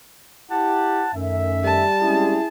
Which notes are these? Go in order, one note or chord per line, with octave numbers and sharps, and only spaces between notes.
E4 G4 F#5 A5
F#2 D#3 A3 E5
G3 A5
G#3 C4 C#4 E4 G#4